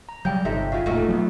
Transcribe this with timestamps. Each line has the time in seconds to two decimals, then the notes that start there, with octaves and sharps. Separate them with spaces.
0.09 A#5
0.25 C#3 F#3 G3 G5 G6
0.45 G1 C3 D#4 A4 E5
0.72 C#3 G#3 F4 E5 F5
0.86 E1 A#2 A3 D#4 F#4
1.09 F#3 G3 B3